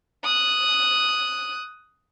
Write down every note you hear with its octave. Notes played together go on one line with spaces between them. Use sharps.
D#6 F#6